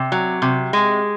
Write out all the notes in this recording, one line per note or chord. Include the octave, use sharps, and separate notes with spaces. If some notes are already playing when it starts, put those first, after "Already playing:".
Already playing: C3
F#3
C3
G#3